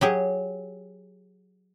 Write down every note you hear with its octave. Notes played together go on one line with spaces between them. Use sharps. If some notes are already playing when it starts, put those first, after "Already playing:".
F#3 G4 G#4